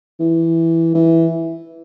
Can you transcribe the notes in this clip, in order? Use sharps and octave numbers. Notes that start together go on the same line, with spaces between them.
E3
E3